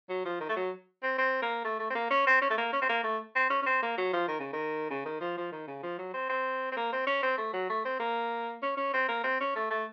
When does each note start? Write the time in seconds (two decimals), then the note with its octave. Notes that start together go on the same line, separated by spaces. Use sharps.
0.09 F#3
0.25 F3
0.40 D#3
0.49 A3
0.56 F#3
1.03 C4
1.18 C4
1.42 A#3
1.65 A3
1.80 A3
1.90 C4
1.95 A#3
2.11 C#4
2.27 C4
2.42 C#4
2.50 A3
2.58 A#3
2.73 C#4
2.82 C4
2.89 A#3
3.04 A3
3.36 C4
3.50 C#4
3.62 C#4
3.66 C4
3.82 A#3
3.98 F#3
4.13 F3
4.28 D#3
4.40 C#3
4.53 D#3
4.90 C#3
5.06 D#3
5.21 F3
5.37 F3
5.52 D#3
5.67 C#3
5.83 F3
5.99 F#3
6.14 C4
6.29 C4
6.72 C4
6.77 A#3
6.92 C4
7.07 C#4
7.23 C4
7.38 A3
7.53 F#3
7.69 A3
7.85 C4
8.00 A#3
8.63 C#4
8.77 C#4
8.94 C4
9.08 A#3
9.24 C4
9.40 C#4
9.55 A3
9.70 A3